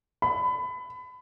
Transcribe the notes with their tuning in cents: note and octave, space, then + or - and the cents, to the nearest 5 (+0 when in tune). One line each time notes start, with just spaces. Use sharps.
B5 +25